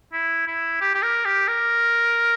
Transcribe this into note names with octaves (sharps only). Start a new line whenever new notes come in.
E4
E4
G4
G4
A#4
G4
A#4